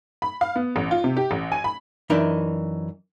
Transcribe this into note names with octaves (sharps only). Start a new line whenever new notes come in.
B5
F5
B3
A1
F4
C3
G4
A1
G#5
B5
F#2 E3 D4 D#4 A#4 E5